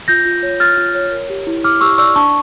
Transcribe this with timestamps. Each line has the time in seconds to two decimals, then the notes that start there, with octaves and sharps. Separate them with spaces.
0.08 F4 G6 A#6
0.25 F4
0.43 C#5
0.60 F4 F6 A6
0.77 F4
0.95 C#5
1.12 A#4
1.30 G4
1.47 E4
1.63 E4 D6 F6
1.81 G4 C#6 E6
1.98 D5 C#6 E6
2.16 D4 A5 C#6